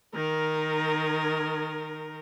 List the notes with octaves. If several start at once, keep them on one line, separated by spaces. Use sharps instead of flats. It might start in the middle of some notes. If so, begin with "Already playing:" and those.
D#3 A#4